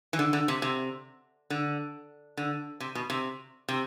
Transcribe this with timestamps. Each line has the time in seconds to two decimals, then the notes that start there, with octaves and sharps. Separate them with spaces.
0.13 E3
0.19 D3
0.33 D3
0.48 C3
0.62 C3
1.50 D3
2.37 D3
2.80 C3
2.95 B2
3.10 C3
3.69 C3